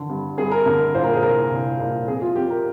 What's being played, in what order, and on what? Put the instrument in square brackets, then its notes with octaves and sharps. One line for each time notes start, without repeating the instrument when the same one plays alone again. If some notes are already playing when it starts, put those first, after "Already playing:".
Already playing: [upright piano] D3 D#3
G2
G2 G#4
A#4
D3 A#4
A#2 C5
A#4
G#4
C2 A#4
C2
A#2
F2 G#4
F4
F2 G4
A#4